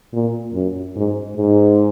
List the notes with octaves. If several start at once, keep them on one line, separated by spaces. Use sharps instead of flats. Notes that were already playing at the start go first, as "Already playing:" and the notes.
A#2
F#2
G#2
G#2